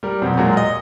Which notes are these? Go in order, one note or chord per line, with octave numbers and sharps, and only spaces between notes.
G3 A#4
F2 B2 F#3 C4
A#2 F#3 G#3 A#3
D#5